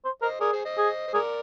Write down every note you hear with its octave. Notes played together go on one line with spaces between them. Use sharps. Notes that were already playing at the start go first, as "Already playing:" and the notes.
C5
A#4 C5 D#5
G#4 A#4 D5
G#4 C5
C5 D#5
G#4
C5
G#4 A#4 D5